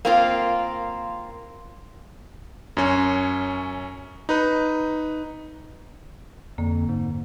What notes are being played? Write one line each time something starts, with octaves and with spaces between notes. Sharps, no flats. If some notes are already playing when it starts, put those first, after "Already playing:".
A#3 C4 F4
F#2 C#4
D#4 B4
F2 D3 A#3
G#2